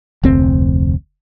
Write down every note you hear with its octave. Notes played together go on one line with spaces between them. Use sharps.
F1 D2 C4